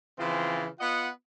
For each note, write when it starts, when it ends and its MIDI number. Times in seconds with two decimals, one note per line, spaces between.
0.18 0.66 49
0.18 0.66 52
0.18 0.66 53
0.18 0.66 60
0.18 0.66 65
0.79 1.09 59
0.79 1.09 65
0.79 1.09 75
0.79 1.09 78